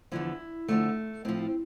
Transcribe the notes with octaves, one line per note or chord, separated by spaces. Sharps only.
E2 D3 F3 E4
F2 D3 F3 A3
A2 F3 C4